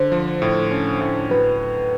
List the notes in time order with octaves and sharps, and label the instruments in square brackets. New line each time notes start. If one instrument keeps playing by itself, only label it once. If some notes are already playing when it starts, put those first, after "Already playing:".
Already playing: [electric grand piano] D3 [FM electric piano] C5
[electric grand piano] F3
A2
C#4
A2
[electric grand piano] F#3 [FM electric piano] B4